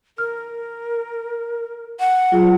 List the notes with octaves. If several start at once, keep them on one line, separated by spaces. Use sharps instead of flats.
A#4 F6
F#5
F#3 F4 G#4